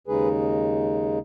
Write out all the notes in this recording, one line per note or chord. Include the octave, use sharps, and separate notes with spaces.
D#2 C#3 G#3 D#4 G#4 B4